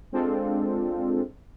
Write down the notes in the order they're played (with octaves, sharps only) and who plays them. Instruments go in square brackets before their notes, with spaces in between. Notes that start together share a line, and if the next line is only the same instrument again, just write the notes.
[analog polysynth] G#3 C4 D4 F4 A4